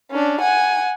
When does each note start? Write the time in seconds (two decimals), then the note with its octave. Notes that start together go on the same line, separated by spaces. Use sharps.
0.11 C#4 D4
0.41 F#5 G#5